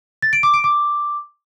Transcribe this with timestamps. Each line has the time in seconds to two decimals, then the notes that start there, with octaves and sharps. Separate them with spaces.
0.22 A6
0.33 D7
0.43 D6
0.54 D7
0.64 D6